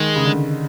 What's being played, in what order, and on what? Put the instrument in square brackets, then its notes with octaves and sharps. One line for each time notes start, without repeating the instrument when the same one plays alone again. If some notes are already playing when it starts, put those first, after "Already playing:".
Already playing: [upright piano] D#3 [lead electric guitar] G#3
[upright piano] C#3
D3